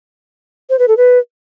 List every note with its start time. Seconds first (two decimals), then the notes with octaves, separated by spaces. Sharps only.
0.70 C5
0.79 B4
0.88 A4
0.97 B4